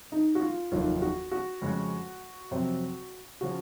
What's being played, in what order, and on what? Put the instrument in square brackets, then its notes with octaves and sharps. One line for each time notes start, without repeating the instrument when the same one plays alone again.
[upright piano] D#4
F#4
F4
[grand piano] F1 D#2 D#3 F#3 [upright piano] F4
[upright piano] F#4
F#4
[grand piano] F2 C#3 G#3
F2 C3 F#3 C4
[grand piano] C#3 F3 [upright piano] F#4